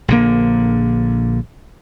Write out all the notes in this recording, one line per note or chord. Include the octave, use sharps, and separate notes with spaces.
A#1 D3 A#3